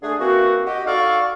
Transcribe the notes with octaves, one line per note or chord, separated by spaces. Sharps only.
D3 A3 D4 G#4
E3 A#3 C4 F#4
F#4 G4 D#5
D#4 F#4 A4 D5 F5 C#6